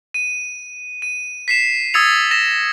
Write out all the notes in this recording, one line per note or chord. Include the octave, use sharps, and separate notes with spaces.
D#7
D#7
B6 C7 E7
D#6 E6 G#6 A6 C#7 F7
A#6 E7